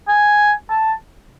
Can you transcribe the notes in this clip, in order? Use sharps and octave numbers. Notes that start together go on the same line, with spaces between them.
G#5
A5